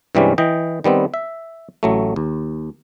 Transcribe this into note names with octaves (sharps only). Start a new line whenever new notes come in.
G2 C3 E3 G3 G#3 C#4
E3 D#5 G5
D#3 G3 B3 C4
E5
A1 F#3 A3
D#2